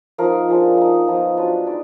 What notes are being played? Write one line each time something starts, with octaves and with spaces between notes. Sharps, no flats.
F3 A#3 D#4 A#4
F3 G#3 D4
A#3 D#4
F3 B3 D#4
F#3 D4 F4 B4
G#3 D#4 D5